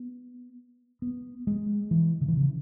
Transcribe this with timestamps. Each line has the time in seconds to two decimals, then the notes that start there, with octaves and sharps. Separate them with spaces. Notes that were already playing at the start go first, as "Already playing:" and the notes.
Already playing: B3
1.02 B3
1.47 G#3
1.91 E3
2.21 C#3
2.28 E3
2.37 C#3